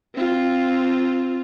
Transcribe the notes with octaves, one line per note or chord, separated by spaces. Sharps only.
C4 F4